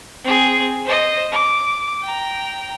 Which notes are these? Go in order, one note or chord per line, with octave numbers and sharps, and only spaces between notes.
C4 G#4
C5 D#5
D6
G5 A#5